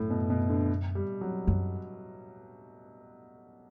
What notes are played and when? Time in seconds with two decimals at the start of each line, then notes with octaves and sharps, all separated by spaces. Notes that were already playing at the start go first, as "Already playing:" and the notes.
Already playing: F#2 A2
0.10 B2
0.30 B2
0.49 D3
0.95 G3
1.21 F#3
1.47 F#2